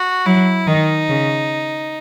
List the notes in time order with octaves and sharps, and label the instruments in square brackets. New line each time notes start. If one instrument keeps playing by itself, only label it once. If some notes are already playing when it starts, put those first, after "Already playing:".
Already playing: [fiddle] F#4
[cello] F#3 [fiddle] E4
[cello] D#3 [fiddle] D#4
[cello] C#3